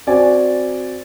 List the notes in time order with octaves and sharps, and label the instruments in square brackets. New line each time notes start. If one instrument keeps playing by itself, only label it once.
[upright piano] C4 F#4 D5 G#5